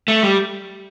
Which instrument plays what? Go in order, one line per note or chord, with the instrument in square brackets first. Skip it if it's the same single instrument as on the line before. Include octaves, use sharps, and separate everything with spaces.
[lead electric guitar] A3
G3